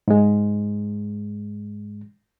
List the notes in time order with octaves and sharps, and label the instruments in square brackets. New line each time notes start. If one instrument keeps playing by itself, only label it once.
[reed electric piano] G#2 G#3